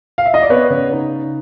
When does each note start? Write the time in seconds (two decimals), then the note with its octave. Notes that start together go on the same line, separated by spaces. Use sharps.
0.18 F5
0.26 E5
0.34 D#5
0.42 D5
0.50 B3 B4 C#5
0.70 C#3
0.92 D#4